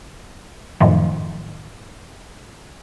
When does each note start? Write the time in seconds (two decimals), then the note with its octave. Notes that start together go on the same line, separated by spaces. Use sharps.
0.80 F#2 A2 D#3 F3